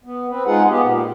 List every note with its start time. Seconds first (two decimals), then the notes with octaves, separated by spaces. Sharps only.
0.04 B3
0.30 C4 B4
0.46 G#3 D#4 F4 G#4 F#5
0.69 B3 G4
0.82 A#2